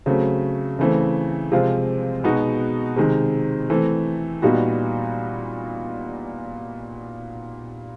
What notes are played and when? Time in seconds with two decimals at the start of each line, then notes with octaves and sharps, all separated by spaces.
0.06 C#3 F#3 A3 C4
0.79 C#3 E3 A3 C4
1.52 C3 F3 G#3 C4 F4
2.24 B2 G#3 B3 D#4 F#4
2.96 C3 D#3 G#3
3.70 E3 A3 C4
4.42 A#2 G3 B3 D#4 F#4